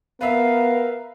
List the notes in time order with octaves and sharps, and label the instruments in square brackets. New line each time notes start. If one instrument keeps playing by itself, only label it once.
[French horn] B3 [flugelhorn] A#4 [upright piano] B4 E5 [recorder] F5